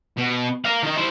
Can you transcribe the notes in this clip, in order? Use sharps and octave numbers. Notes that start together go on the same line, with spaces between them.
B2
A#4 F5
D#3 D#4
E4 C5